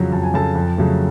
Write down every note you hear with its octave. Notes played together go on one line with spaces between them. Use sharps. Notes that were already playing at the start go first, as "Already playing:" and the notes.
Already playing: F2 C#3 F#3 F4
F2 A5
G#5
C#3 F#3 A4 A5
F2
C#3 F#3 A3